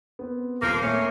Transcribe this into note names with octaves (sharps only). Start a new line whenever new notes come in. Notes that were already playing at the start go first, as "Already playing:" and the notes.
B3 C4
D#1 F2 F3 A#3 C7
A3 A#3 C#4